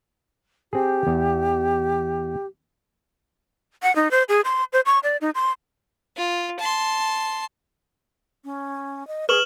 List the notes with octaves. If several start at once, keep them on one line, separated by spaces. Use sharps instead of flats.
C4 G4 G#4
E2
F#5
D#4
C5
G#4
C6
C5
C#6
D5
D#4
C6
F4
A5 C6
C#4
D#5
G#4 B4 C#6 F6 E7 F#7